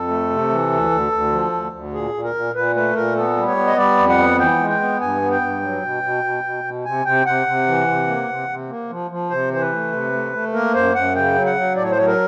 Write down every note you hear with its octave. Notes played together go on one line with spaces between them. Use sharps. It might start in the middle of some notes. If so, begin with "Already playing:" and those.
Already playing: F2 A4
A3
C3
E3
D2
D2
D2
F3
D2
D2
A#2 G#4
A#2
A#4
A#2
A#2 B4
A3 B4
A#2 A#4
B3 A4
G3
C#5
B3
D#5
G3 D5
F2
F#5
B3
E3 G5
G#3
G5
B3
G2 G#5
B3
G5
G2
F#3
B2
B2
B2
B2
B2
C3 G#5
C3 G5
C3 F#5
C3
E3
C3
A#3
C3
C3
A#3
F3
F3
C3 C5
E3 C5
B4
A3
C3
A3
A3
A#3 A#4
F#2 C5
F#2 F#5
C#3 G5
F#3
F#5
F#3
A2 D5
C#5
C5
F#3 C#5
A#4